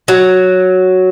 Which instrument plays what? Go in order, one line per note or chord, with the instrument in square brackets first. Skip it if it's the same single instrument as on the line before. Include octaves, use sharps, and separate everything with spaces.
[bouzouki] F#3